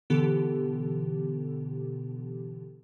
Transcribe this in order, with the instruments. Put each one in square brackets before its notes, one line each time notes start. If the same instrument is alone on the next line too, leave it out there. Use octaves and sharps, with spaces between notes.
[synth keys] B2 D3 E3 B3 G4 A4